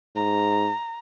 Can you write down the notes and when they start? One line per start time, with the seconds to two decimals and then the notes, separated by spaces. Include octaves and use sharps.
0.16 G#2 A#5